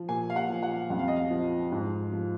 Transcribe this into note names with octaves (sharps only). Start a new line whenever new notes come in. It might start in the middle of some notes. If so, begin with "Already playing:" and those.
Already playing: F3
A#2 G#5
F5
F#5
F3
F#5
F2 F#5
F5
D#5
F5
F3
G#2
F3